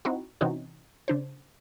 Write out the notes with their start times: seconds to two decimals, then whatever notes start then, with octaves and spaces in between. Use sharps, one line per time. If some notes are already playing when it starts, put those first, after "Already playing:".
0.05 C4 D#4 E4 F#4
0.41 C3 E3 C4 C#4 D#4 F#4
1.08 C#3 D4 C5